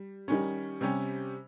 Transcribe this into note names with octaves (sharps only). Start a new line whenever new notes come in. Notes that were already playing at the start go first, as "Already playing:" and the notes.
Already playing: G3
D#3 G3 C#4
C3 G3 C#4 G4